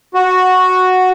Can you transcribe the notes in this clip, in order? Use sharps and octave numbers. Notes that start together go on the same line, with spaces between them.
F#4